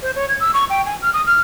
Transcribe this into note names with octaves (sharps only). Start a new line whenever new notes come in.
C5
C#5
G#6
E6
C#6
G5
G#5
F6
D#6
F6